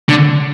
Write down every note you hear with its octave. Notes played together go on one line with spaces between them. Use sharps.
D3